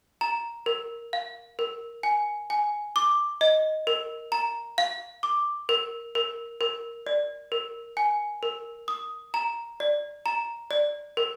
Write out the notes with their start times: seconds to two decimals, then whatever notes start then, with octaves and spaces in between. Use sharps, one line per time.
0.21 A#5
0.66 A#4
1.13 F5
1.59 A#4
2.03 G#5
2.50 G#5
2.96 D6
3.41 D#5
3.87 A#4
4.32 A#5
4.78 F5
5.23 D6
5.69 A#4
6.15 A#4
6.61 A#4
7.07 D5
7.52 A#4
7.97 G#5
8.43 A#4
8.88 D#6
9.34 A#5
9.80 D5
10.26 A#5
10.71 D5
11.17 A#4